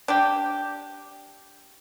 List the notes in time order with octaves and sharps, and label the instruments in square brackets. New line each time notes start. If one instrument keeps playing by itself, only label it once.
[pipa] D4 G4